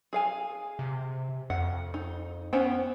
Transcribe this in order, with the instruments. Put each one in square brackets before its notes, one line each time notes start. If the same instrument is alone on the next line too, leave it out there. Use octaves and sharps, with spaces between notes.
[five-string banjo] G#4 F5 G#5
[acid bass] C3
[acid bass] F2 [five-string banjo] F#5
[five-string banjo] D#4
[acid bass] B3 [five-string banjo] C#4 C5 G5